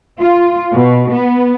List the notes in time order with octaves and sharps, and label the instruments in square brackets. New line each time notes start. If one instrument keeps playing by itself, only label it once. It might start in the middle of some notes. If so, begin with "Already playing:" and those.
[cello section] F4
B2
B3